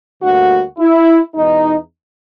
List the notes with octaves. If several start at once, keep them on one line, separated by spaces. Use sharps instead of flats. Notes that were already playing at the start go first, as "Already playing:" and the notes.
D2 D3 G3 A#3 F#4
E4
E2 B2 G#3 D#4